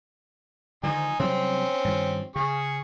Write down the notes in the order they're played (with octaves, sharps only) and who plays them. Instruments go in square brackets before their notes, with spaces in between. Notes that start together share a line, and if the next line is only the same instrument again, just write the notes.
[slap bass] D3 D#3 F3 [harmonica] D#4 G#5
[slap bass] C3 F#3 G3 [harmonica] C4 C#4
[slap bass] G2 D#3 F3
[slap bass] C#3 [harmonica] G#4 C#6